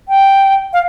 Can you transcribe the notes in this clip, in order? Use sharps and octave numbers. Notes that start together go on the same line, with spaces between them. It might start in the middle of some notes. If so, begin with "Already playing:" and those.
G5
F5